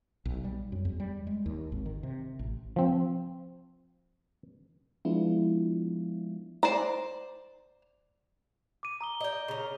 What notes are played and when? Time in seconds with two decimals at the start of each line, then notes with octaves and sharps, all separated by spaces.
0.25 B1
0.44 G3
0.72 F#2
0.85 E2
1.00 G3
1.27 G#3
1.46 D#2
1.72 G#1
1.86 D#3
2.03 C3
2.39 A1
2.76 F3 C4
5.05 F3 G#3 B3 D4 E4 F4
6.63 C5 D5 A#5
8.83 D6 D#7
9.01 A#5 D#6 G7
9.21 D#5 G5
9.48 C#3 A#4